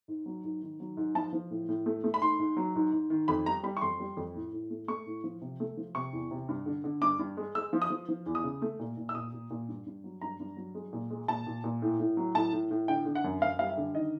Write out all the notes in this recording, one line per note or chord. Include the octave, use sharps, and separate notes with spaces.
G#2
F#3
G#2
D#3
F#3
G#2
F3 A5
F3
A2
A2
A3
A3
B5
G#2 C6
G#2
F#3
G#2
G#2
D#3
F2 B5
G3 A#5
G3 B5
C#6
F2 C6
G3
F2
A2
A2
A3
A3 C#6
A2
F3
C3
A3
F3
C3 C#6
E2
C3
G2
D3
D3
G2 D6
G2
G#3
G#3 E6
F3
D#6
F3
F3
E2
D#6
C#3
A3
A#2
A#2
E6
A#2 D#6
A#2
A#2
G2
G2
F#3
G2 A#5
G2
F#3
G#3
A#2
G#3
A#2 A5
A#2
A#2
A2
A2
F#3
A2 A5
A2
A2
D3 G5
D3
F#5
F#2
F#2 F5
G3 F5
E5
D3
D#3 D#5